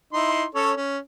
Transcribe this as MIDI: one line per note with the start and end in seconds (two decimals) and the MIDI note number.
0.13 0.45 63
0.13 0.45 64
0.13 0.45 84
0.55 0.72 61
0.55 0.72 69
0.55 0.72 73
0.77 0.98 61